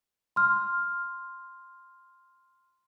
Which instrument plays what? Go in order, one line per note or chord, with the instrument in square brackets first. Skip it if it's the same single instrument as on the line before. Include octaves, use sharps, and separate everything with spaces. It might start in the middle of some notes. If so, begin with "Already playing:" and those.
[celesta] C6 F6